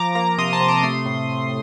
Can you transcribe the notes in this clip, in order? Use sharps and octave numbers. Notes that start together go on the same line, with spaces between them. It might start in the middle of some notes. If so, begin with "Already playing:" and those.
Already playing: F3 A#5 D6
A#3 A#5 D6
C3 C6 D#6
A5 C6
C3
A#5 D6
A3 C6 D#6
A2
A2